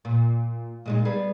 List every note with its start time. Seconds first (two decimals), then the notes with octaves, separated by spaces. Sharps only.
0.05 A#2
0.86 A#2 G#3 D#4
1.05 G3 B3 G#4